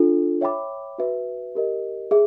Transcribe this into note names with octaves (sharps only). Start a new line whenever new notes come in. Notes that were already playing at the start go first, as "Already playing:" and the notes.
Already playing: D4 F4 A4
C#5 E5 G5 B5 D6
F#4 B4 E5
G4 A#4 D#5
G#4 E5